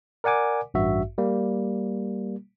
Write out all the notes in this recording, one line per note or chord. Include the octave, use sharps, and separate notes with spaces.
A#4 D5 F#5 G#5 D6
A1 G2 F#4 E5
G3 A#3